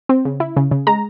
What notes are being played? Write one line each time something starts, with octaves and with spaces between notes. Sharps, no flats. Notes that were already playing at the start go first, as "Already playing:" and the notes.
C4
C#3
E4
C#3
C#3
G#3 A#5